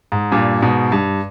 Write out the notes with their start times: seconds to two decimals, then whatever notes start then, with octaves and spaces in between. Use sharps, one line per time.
0.12 G#2
0.32 G2 A#2
0.62 G#2 B2
0.92 G2